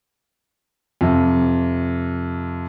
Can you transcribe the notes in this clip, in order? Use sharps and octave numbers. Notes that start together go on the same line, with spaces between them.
F2 C3